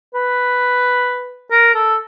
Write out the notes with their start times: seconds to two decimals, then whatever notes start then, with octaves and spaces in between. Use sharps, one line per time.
0.15 B4
1.51 A#4
1.75 A4